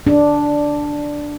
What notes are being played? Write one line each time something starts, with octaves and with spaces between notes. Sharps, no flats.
D4